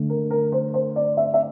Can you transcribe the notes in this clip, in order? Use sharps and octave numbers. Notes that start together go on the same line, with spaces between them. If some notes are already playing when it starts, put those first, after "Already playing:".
Already playing: D3 A3
A#4
A#4
C5
C5
D5
E5
E5